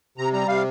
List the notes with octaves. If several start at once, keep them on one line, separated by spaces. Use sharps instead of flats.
C3 A#5
G3 A#5
C3 F5